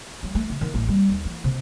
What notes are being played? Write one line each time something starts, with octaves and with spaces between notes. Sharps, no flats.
F#3
A3
C#3
D#3
A1
G3
D#2
E3
C3